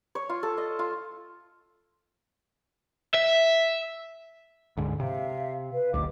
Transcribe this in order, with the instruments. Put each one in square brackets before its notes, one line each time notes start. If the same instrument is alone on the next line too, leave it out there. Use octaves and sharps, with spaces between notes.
[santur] C#5
F4
A4
D#5
F4
[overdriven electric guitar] E5
[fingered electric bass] D2 G#2
[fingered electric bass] C3 [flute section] E5 F5
[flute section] B4 F5
[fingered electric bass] D1 G#1 D2 [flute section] G4 D#5 D6